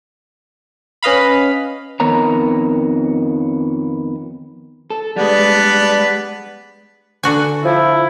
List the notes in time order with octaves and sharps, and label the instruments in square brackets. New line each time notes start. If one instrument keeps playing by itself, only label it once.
[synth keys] C#4 B4 D#5 F5 B5
[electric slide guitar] F2 D#3 B3 A#4 C#5 A#5
[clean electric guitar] A4
[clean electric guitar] G3 G#3 [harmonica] B3 D4 B4
[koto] D3 F#4 G#5
[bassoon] F3 [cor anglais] E4